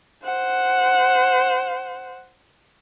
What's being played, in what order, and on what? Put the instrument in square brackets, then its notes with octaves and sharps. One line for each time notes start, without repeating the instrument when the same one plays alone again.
[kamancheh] C5 F#5